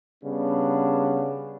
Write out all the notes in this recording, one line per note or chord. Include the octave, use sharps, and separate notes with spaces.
C#3 G3 B3 D4